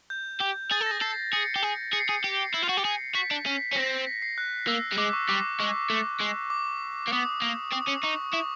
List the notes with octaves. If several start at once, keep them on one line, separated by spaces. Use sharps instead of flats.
G6
G4
G#4 A6
A4
A#6
G#4
A4 C7
G#4 C#7
G4
G#4
G#4 C#7
C7
G#4 C#7
G4
E4
F4
F#4
G4
G#4
F#4 B6
D4
C#4
C#4
C4 A#6
B6
C7
F#6
A#3 E6
G3
G#3 D6
C#6
G3 D6
G#3 C#6
A3
G#3
D6
A#3
B3 D#6
A#3
C4 D#6
C#4 D6
D#4 C#6
E4 C#6